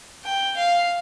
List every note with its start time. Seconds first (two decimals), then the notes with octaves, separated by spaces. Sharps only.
0.24 G5
0.57 F5